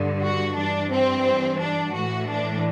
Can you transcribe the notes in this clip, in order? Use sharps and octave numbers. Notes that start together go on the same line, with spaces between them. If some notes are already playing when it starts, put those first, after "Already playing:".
Already playing: G2 D3
F#4
G2 E3 D4
C4
D4
A2 E3 F#4
D4